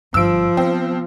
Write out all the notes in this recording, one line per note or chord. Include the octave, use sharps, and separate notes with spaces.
G1 G2 F3 E6 D7
B3 C4